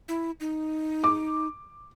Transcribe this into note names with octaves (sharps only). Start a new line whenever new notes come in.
E4
D#4
D6